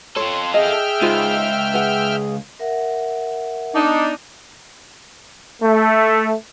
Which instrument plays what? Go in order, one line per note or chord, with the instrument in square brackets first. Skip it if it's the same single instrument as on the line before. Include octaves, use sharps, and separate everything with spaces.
[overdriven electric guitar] F4 A4 [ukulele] C#5 [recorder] C6
[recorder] G#4 [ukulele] D#5 [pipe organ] E5 G5 F6
[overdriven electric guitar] C#2 [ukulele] D#4 F4 C5
[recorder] G#4 [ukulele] B4 F#5
[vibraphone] A#4 E5 F#5
[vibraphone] B3 D6 [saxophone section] D4 D#4
[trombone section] A3